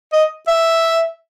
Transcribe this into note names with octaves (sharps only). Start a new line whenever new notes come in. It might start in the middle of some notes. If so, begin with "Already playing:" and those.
D#5
E5